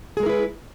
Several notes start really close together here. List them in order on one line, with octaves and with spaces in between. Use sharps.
G#4 G#3 A#4 E4 B4